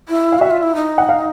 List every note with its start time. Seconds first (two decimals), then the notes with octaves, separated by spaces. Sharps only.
0.09 E4
0.32 F5
0.39 F#4 E5
0.50 F4
0.63 E4
0.75 D#4
0.98 F#5
1.09 F5